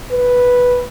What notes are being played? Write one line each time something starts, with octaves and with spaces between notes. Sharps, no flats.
B4